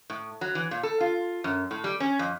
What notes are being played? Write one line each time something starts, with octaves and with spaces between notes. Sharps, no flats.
A2
F#3
E3
A#2
A4
F4
F#2
A2
G3
C#4
F2